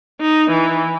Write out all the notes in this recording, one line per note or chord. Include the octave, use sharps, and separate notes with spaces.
D#4
E3